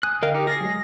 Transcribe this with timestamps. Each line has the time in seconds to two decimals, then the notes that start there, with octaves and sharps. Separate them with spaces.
0.03 G#5 D#6 F#6
0.23 D3 A#4 D#5 F5 G5
0.34 D#4 G4
0.47 G#4 F6 A6 A#6 C7
0.61 F#3 G#3